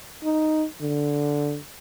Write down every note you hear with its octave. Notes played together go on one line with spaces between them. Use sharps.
D#4
D3